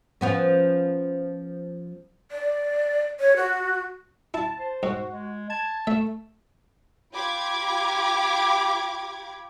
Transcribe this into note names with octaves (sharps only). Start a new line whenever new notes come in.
F3 B3 C#4
D5
C#5
F#4
E4 A5
C5
G#2 F#4
G#3
A5 G#6
A3 E5
F4 G4 B5 D6 G#6